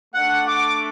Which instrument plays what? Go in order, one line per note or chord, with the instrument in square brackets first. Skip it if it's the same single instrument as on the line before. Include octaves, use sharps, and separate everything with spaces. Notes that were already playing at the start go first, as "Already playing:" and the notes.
[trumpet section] A3 D4 A4 [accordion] F#5
[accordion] D6